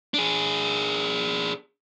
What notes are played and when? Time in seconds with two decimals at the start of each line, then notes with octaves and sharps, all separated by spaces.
0.14 D4 G#4